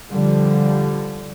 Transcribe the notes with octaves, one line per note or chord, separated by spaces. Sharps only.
D3 F3 G3